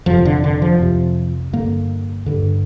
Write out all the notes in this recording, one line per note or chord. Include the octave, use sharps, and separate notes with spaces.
F2 C3 F3
D3
D3
F3
F2 C3
G2 D3 A#3
G2 D3